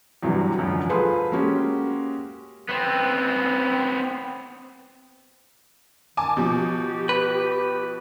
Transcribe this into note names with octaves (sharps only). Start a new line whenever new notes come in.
E2 G2 C3 E3 F#3
C#2 F#2 D3 F3
F4 G#4 A4 B4 C5
G#3 A#3 C#4 F#4 G4
B3 C4
D#3 G#5 A5 D6
B2 F3 G4
B4